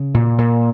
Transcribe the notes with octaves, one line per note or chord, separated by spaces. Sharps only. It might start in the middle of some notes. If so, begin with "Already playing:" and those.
Already playing: C#3
A#2
A#2